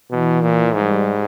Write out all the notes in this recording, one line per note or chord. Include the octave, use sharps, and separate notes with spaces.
B2 E3
A#2
G#2 G3